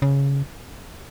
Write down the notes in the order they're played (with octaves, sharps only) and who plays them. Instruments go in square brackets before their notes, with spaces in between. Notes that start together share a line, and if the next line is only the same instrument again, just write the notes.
[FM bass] C#3